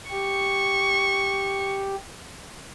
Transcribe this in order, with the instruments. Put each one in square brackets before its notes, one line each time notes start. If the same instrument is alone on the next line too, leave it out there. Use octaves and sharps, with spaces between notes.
[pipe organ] G4 [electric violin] C#6